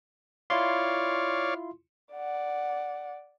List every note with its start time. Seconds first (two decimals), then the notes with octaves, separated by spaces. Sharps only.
0.50 E4 F4 C#5 D5 F5 C6
2.13 D5 F#5